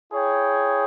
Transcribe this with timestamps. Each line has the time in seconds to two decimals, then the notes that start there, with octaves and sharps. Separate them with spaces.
0.12 E4 G#4 C#5 G5